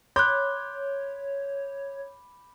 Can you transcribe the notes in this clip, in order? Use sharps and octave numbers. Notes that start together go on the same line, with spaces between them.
C#5 B5 C6 D6 F#6 G6